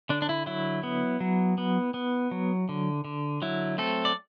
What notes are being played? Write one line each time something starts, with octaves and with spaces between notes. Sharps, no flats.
D3 D4
D4
E4
F#3 E4
B3
F#3
B3
B3
F#3
D3
D3
F#3 E4
A3 C4 A4
D5